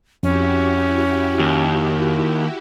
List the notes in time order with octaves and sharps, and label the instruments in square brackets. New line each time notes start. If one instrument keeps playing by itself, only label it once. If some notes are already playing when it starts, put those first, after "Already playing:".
[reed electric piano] F2 [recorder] C#4 [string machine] E4 F#4 G4
[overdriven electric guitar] D#2